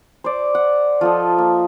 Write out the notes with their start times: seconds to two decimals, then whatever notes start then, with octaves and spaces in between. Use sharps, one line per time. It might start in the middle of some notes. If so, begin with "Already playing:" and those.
0.24 C5 D5
0.55 F#5
1.01 F3 A4 D#5
1.38 A#3